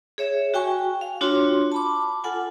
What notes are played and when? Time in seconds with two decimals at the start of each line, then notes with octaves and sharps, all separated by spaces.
0.18 G#4 C#5 E5
0.54 F#4 G5 G#5 C#6
1.01 F5
1.21 D4 F4 F#4 C#5 C6
1.72 A5 B5 D6
2.24 F4 A4 F#5 G#5